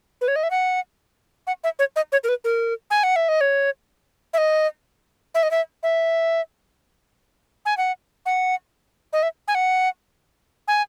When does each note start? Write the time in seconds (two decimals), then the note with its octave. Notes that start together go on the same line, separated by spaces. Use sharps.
0.21 B4
0.28 C#5
0.36 D#5
0.43 E5
0.51 F#5
1.47 F#5
1.64 E5
1.79 C#5
1.96 D#5
2.12 C#5
2.24 A#4
2.29 B4
2.44 A#4
2.91 G#5
3.03 F#5
3.16 E5
3.29 D#5
3.41 C#5
4.34 E5
4.38 D#5
5.35 E5
5.43 D#5
5.51 E5
5.83 E5
7.66 G#5
7.77 F#5
8.26 F#5
9.13 D#5
9.23 E5
9.48 G#5
9.55 F#5
10.68 G#5